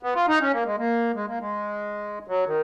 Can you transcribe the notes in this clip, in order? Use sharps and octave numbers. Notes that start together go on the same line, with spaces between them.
B3
F4
D#4
C#4
A#3
G#3
A#3
G#3
A#3
G#3
F#3
D#3